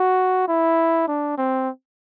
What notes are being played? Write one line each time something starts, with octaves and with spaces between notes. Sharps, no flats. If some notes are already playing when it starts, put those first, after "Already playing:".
Already playing: F#4
E4
D4
C4